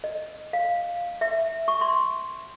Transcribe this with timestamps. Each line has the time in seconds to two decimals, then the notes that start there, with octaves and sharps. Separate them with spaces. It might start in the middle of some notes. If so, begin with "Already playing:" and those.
0.04 D#5
0.53 F5
1.21 E5
1.68 C#6
1.81 C6